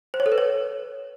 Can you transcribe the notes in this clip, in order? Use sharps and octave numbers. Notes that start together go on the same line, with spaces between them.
C5
C#5
A4
B4
C#5